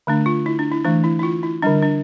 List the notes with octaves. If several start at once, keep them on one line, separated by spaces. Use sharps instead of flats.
D3 A3 D4
F4
E4
D4
E4
E3 A3 D4
E4
E4
F4
E4
D3 G3 D4
D4